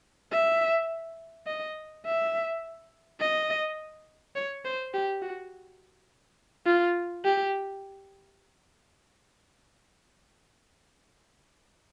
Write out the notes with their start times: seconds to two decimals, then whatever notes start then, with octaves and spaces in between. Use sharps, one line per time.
0.32 E5
1.47 D#5
2.06 E5
3.20 D#5
4.36 C#5
4.65 C5
4.94 G4
5.22 F#4
6.66 F4
7.25 G4